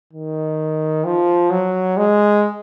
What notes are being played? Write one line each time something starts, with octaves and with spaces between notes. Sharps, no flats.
D#3
F3
F#3
G#3